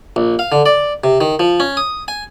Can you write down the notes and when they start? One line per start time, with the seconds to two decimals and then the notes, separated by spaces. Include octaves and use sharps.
0.16 A#1
0.39 F5
0.52 D3
0.66 D5
1.04 C3
1.21 D#3
1.40 F3
1.60 C#4
1.77 D#6
2.08 G#5